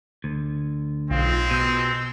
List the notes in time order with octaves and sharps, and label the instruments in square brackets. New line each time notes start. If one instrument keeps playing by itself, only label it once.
[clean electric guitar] D2
[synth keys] B1 F4 [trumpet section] G#3 C4
[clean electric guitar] B2 [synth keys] E6 G6